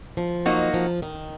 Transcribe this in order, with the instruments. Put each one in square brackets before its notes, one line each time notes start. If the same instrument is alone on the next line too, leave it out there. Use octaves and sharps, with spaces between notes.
[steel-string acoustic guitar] F3
[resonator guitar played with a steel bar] F#3 A#3 D#4 F#4
[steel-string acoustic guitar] F3
D#3